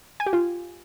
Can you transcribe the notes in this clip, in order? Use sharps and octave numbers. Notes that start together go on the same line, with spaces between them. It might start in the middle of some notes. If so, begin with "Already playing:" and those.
G#5
G4
F4